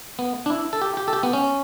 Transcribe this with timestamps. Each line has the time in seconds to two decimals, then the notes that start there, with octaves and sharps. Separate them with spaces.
0.19 B3
0.46 D4
0.50 E4
0.73 A4
0.81 G4
0.97 G4
1.08 A4
1.13 G4
1.23 B3
1.33 C#4